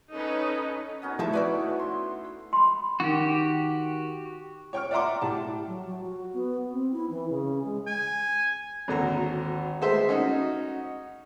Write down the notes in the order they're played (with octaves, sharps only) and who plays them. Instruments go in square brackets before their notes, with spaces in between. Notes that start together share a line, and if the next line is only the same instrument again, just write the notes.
[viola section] C#4 D#4 A4 B4
[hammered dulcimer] B3 C#4 D#4 [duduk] F#4
[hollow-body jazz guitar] F3 E5 A5 [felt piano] A3 E4
[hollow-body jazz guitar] B4 D5 E5
[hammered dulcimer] C6
[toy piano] B5 C6
[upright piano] D#3 [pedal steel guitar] F#4 G4
[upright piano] C#5 G5 C#6 F6
D5 E5 F#5 A#5 C6 D6
A2 G4 A5
[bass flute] F#3
F#3
F#4
B3
C4
E4
E3
C#3
G#3
[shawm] G#5
[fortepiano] G#1 D#2 D3 F#4 A#5
G#3 A3 C5 E5
C#4 D#4 F#4